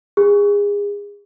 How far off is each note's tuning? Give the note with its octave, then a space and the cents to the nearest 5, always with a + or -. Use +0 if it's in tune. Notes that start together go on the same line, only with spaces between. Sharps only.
G#4 -30